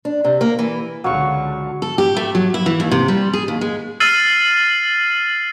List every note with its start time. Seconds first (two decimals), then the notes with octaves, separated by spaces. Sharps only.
0.05 D4
0.25 C3
0.41 A#3
0.59 E3
1.04 C#2 D3 F#3 F5 C#6
1.82 A4
1.98 G4
2.16 A3
2.35 F#3
2.54 E4
2.66 E3
2.80 D#2
2.91 C3
3.08 G3
3.33 G#4
3.48 D#2
3.61 G#3
4.00 E6 F6 A6 C7 D#7 F#7